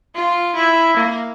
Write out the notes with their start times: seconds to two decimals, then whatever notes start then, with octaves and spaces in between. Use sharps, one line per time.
0.15 F4
0.55 E4
0.97 A#3